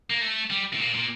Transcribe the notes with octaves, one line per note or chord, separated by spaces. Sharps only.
A#3
A3
G3
A2
A#2
A#2